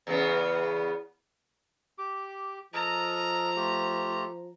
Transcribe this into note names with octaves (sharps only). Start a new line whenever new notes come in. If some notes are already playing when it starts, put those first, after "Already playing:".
E2 C#3 B3
G4 D6
F3 A4 A#4 D#5 A#5
A3 F4 G4